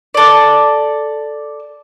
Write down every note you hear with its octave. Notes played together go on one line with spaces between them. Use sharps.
A4 D5